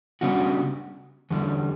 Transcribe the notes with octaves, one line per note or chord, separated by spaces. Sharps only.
C#3 G3 B3 D4 F#4
E2 D3 G3